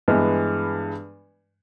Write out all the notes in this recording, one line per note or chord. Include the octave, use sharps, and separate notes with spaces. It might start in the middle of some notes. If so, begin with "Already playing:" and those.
G2 E3 G#3 B3